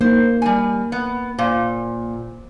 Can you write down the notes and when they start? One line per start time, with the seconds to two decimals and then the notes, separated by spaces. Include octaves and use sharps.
0.01 A#3 D#4 C5
0.42 G3 G#5
0.92 B3
1.39 A#2 C5